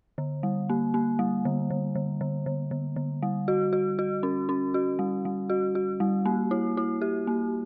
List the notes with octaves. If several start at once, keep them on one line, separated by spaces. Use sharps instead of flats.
D3
G3
A#3
A#3
G3
D3
D3
D3
D3
D3
D3
D3
G3
F#4
F#4
F#4
C#4
C#4
F#4
G3
G3
F#4
F#4
G3
A#3
E4
E4
G4
A#3